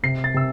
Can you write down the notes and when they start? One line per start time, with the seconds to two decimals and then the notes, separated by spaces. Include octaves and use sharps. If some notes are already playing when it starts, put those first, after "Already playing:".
0.03 C3 C7
0.24 A6
0.34 C3 E6